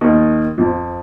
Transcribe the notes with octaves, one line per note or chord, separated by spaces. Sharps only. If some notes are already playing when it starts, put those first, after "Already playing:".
D#2 D#3
F2 F3